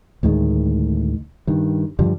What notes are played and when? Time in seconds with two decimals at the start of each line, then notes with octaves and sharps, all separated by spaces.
0.23 D2 A2 D#3 G#3
1.47 G2 D#3
1.99 G2 D3 F3 G3